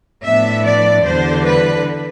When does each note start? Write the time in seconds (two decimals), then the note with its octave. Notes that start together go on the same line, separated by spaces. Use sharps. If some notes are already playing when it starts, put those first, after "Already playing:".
0.23 A2 F3 B3 D4 E5
0.64 D5
1.04 E2 D3 G3 D4 C5
1.44 B4